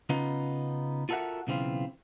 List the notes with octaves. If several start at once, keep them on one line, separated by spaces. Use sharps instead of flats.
C#3 B3 C#4 D#4 F4 B4
F4 F#4 A4 A#4 E5 F#5
B1 C#3 E3 C4 F4